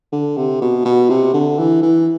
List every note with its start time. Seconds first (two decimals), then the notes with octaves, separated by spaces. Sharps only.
0.12 D3
0.37 C3
0.61 B2
0.85 B2
1.09 C3
1.33 D3
1.58 E3
1.83 E3